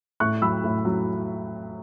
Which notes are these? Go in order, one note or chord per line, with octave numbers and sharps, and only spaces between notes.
A2 C#6 F#6
F#3 B5 E6
A2
F#3